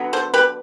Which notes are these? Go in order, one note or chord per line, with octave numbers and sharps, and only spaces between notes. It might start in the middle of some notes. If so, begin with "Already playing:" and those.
Already playing: D3 F#3 B3
A4 C5
G4 B4